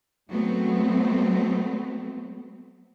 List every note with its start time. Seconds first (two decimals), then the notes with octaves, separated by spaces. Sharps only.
0.29 F#3 G#3 A3 B3 C4